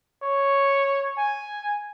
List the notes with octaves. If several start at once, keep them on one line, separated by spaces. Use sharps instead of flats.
C#5
G#5